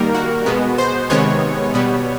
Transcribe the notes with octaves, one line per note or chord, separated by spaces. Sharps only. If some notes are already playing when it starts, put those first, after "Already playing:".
Already playing: D#3 G3 A#3 A#4
F#4
B2 G#3 B3
C5
C3 D#3 G#3 B3 C#5
B2 G3 B3